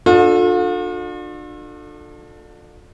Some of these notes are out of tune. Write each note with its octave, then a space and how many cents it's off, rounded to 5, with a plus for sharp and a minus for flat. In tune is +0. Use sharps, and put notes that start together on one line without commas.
D4 +35 F4 +45 A4 +5